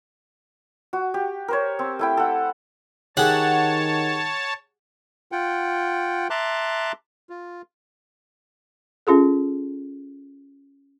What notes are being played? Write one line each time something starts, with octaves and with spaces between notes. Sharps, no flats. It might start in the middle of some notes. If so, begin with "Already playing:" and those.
F#4
G4
A#4 C5 C#5
C4
A3 E4 G5
A4 F#5
D#3 G4 G#4 C#5 F#5 A5
F4 F#5 G5
E5 A5 A#5 C6 D6 F#6
F4
C#4 F4 G#4 A4